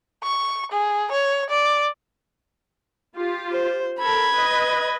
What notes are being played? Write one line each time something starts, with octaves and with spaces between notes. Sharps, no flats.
C#6
G#4
C#5
D5
F4 G4
C5
A4 A#4 B5 G#6
B4 D#5